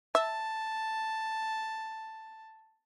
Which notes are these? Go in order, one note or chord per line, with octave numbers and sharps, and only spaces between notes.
E5 A5